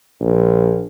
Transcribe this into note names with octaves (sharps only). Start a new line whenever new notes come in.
A#1